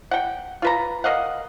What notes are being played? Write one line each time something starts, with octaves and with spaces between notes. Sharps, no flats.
F#5 G5
F4 B4 A#5
A#4 D#5 F5 F#5